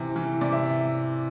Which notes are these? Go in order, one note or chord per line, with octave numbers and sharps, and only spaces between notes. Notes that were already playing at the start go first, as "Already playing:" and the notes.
Already playing: C3 E3
E3
C3 D5
E5